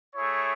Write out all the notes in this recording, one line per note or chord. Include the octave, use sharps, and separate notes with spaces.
A3 E4 G#4 C#5